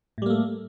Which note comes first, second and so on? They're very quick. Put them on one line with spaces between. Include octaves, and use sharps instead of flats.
A2 G3 A#3 A3